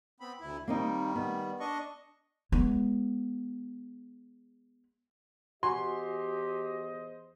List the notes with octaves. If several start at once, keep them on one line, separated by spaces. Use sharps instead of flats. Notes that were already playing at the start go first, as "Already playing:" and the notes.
B3 C4 B5
D2 E4
D#3 G3 A#3 C4 D#4
B3
D4 D#5 C#6
G#3 B3
E2 F#4 G4 C5 D#5 G#5 C6